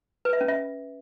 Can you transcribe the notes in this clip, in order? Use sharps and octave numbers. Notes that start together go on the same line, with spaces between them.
B4
E5
C#4
E5